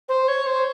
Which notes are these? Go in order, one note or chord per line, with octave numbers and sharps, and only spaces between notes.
C5
C#5
C5